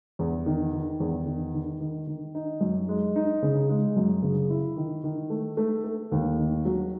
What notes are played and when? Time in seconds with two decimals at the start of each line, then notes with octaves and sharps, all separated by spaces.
0.19 E2
0.46 D#3
0.73 D#3
1.00 E2
1.26 D#3
1.54 D#3
1.80 D#3
2.07 D#3
2.35 D#4
2.61 F#2
2.89 G#3
3.16 D#4
3.42 C#3
3.69 G#3
3.96 F#2
4.22 C#3
4.50 E4
4.76 D#3
5.04 D#3
5.30 A3
5.57 A3
5.84 A3
6.12 D#2
6.38 D#3
6.65 F#3